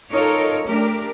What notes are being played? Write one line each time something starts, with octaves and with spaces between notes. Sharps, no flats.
D#4 F4 A4 A#4 C#5
A3 D4 G4 A#4